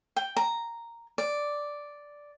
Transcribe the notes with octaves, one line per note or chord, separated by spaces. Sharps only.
G5
A#5
D5